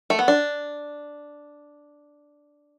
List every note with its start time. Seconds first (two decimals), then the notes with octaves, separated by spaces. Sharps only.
0.10 A3
0.19 B3
0.28 D4